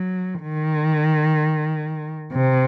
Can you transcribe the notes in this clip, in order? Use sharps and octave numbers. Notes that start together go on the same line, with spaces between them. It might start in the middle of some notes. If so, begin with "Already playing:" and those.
Already playing: F#3
D#3
C3